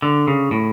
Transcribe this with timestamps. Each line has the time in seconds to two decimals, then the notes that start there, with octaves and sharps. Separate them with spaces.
0.02 D3
0.28 C#3
0.51 A2